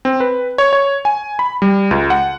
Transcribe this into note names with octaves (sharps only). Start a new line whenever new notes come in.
C4
B4
C#5
C#5
G#5
B5
G3
C#2
F#5